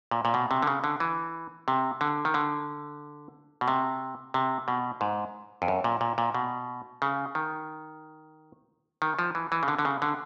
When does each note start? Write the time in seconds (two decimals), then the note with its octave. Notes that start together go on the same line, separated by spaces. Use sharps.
0.11 A#2
0.25 A#2
0.34 B2
0.51 C3
0.62 D3
0.67 C#3
0.84 D3
1.00 E3
1.68 C3
2.01 D3
2.25 D#3
2.34 D3
3.61 B2
3.68 C3
4.34 C3
4.68 B2
5.01 G#2
5.62 F2
5.68 F#2
5.84 A#2
6.01 A#2
6.18 A#2
6.34 B2
7.02 C#3
7.35 D#3
9.02 D#3
9.19 F3
9.35 E3
9.52 E3
9.63 C#3
9.68 D3
9.79 D3
9.85 C#3
10.02 D3